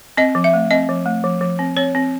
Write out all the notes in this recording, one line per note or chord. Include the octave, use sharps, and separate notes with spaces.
C4 D#5
F3
E5
A3
C4 D#5
F3
A3
F3
F3
C4
C4 C#5
C4